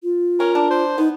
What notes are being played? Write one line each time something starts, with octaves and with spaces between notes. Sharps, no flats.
F4
C#4 A#4
D4
C5
B3 D#4